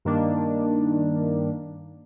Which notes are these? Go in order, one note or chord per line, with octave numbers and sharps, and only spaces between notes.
G2 D#3 A#3 D4